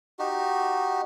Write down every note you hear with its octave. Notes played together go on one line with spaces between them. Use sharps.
D#4 F#4 G4